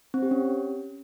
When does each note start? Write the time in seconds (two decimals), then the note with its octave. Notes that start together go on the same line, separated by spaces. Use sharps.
0.14 C4
0.23 G4
0.31 C#4